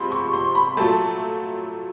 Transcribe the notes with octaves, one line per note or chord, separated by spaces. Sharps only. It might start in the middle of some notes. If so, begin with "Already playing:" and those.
Already playing: C3 F3 G#3 B5 C6
C#6
C6
B5
A#2 F#3 A3 A5